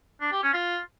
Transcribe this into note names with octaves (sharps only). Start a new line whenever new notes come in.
D4
G4
C#4
F4